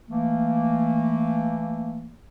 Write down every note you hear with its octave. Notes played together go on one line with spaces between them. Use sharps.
E3 A3 A#3